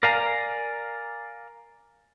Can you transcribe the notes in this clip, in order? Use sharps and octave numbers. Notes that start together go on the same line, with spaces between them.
A#4 D5 F5 G#5 A#5